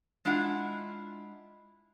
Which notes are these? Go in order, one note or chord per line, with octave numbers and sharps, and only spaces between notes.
G#3 D4 E4 F4 F#5